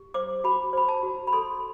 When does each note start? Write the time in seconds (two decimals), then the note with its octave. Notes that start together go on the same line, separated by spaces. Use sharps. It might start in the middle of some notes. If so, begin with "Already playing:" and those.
Already playing: G4
0.14 C5 D6
0.44 F#4 B5
0.73 C5 B5
0.89 A5
1.03 F#4
1.27 B5
1.33 A4 C6